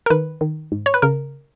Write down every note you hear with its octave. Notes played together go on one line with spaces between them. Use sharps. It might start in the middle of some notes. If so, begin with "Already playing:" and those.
A#4
D#3 B4
D#3
G#2
C#5
B4
C#3 A#4